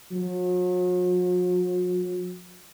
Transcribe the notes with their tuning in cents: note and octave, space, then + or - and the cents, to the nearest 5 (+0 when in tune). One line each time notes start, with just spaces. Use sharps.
F#3 -45